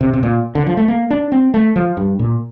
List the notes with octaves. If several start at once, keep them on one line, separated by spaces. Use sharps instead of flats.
C3
C3
A#2
D3
F3
A3
A#3
D4
C4
A3
F3
G2
A#2